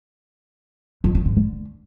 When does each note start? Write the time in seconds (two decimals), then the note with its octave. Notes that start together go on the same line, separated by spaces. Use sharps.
1.04 F2
1.15 D3
1.25 G#2
1.36 D3